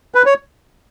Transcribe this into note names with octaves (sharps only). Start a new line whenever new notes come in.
B4
C#5